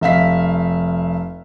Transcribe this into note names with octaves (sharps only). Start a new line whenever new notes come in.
F1 E5 F5 B6